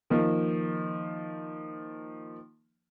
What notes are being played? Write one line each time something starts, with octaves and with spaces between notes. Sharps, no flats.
D#3 F3 A#3